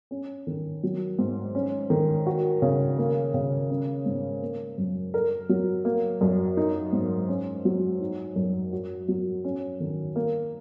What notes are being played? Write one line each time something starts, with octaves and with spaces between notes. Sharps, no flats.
C#4
D#3
F#3
G#2
C#4
D#3
F#4
C#3
A#3
C#3
C#4
G#2
A#3
F#2
A#4
F#3
A#3
F#2
D#4
G#2
C#4
F#3
D#4
F#2
F#4
F#3
C#4
D#3
A#3